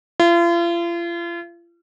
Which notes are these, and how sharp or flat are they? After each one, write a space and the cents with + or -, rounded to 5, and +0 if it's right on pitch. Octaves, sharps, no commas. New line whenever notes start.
F4 -40